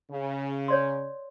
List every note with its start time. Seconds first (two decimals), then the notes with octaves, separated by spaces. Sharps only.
0.11 C#3
0.68 C#5 D5 C6